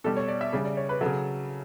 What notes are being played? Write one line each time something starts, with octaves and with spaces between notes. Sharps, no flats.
B2 G3 A4
C#5
D5
E5
C#3 G3
D5
C#5
B4
C#3 F#3 A4